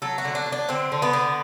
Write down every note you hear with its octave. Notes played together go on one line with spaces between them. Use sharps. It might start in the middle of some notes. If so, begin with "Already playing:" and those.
F#3 A4
F#4
D3
D4
F#3
D4
D3 C4
D3
B3
D3